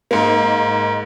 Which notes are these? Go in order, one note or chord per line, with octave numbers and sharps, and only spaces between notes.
G#2 A#3